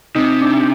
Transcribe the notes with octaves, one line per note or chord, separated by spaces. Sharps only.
C3 D#4
D4